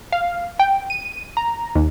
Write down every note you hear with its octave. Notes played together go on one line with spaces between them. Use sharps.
F5
G5
D#7
A#5
D#2